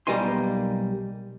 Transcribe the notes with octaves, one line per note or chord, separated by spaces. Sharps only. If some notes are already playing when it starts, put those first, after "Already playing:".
B1 G3 A#3 D#4 G#5 C6